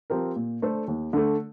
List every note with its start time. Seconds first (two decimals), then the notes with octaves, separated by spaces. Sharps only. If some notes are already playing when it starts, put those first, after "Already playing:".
0.10 F3 C4 G4 A#4
0.36 A#2
0.62 A3 D4 A4 C5
0.88 D#2
1.13 D3 A3